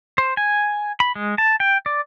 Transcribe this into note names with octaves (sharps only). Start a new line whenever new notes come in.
C5
G#5
B5
G#3
A5
G5
D5